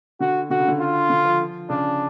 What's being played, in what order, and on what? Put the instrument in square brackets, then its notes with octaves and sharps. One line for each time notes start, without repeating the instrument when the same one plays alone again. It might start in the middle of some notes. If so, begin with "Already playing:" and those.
[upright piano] D3 [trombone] F#4
[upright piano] D3 [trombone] F#4
[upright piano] C#3
D3
[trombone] F4
[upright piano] D3
F3
[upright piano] C#3 [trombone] D4